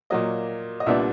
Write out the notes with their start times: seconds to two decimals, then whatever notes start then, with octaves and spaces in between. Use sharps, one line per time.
0.10 A#2 F#3 A#3 D#5
0.80 D#5
0.86 C2 A#2 G3 B3 D4 E5